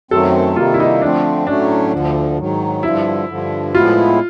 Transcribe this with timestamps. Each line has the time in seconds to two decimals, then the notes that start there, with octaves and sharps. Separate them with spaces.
0.11 F#2 D#3 F#3 A3 C4 A4
0.56 C3 D#3 G3 A#3 F4
0.74 E4
0.80 D#4
1.02 D3 F3 A3 C4 D4
1.47 A2 F#3 A3 C#4 D4
1.93 D2 D3 F3
2.38 G#2 D#3 F#3
2.83 G2 D3 F3 E4
3.29 G2 D3 F3
3.74 A2 F3 G#3 B3 E4 F4